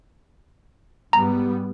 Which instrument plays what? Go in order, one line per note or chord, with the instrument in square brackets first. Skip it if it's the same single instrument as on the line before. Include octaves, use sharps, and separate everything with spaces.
[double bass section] G#2 G3 B3 [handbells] A#5